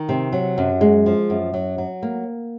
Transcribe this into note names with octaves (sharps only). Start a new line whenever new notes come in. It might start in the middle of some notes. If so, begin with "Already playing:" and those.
Already playing: D#3
C3
F#3
F#2
G#3
F3
F#2
F#3
F#3
A#3